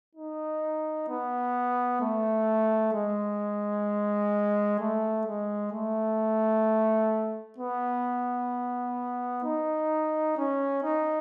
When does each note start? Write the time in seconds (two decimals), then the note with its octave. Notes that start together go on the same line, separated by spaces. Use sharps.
0.15 D#4
1.09 B3
2.01 A3
2.94 G#3
4.80 A3
5.27 G#3
5.72 A3
7.58 B3
9.44 D#4
10.37 C#4
10.83 D#4